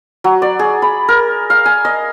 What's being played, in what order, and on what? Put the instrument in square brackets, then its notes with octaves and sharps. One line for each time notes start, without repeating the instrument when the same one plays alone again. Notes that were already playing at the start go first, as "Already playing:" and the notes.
[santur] F#3
D5
G#4
B5
A#4
F5
G#5
D#5